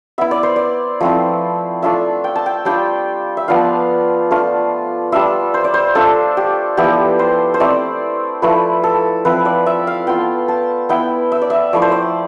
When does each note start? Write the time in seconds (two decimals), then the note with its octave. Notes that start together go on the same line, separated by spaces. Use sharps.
0.18 B3 E4 E5
0.31 D5
0.43 C5
0.56 D5
1.01 F3 A3 C4 E4
1.83 A3 D4 F4 E5
2.24 G5
2.35 A5
2.46 G5
2.65 G3 D4 F4 G5
3.37 E5
3.48 F3 B3 D4 F4 F5
4.31 A3 D4 F4
5.12 G3 D4 F4 E5
5.54 C5
5.64 D5
5.74 C5
5.95 A3 D4 F4 A4
6.37 G4
6.77 F3 B3 E4 G4
7.19 C5
7.54 C5
7.60 A3 C4 E4 D5
8.42 F3 A3 E4 B4
8.84 A4
9.25 F3 C4 E4 B4
9.45 D5
9.66 E5
9.87 F5
10.07 B3 F4 G5
10.48 A5
10.89 B3 E4 G5
11.32 E5
11.42 D5
11.50 E5
11.73 F3 A3 E4 D5
11.82 C5
11.92 D5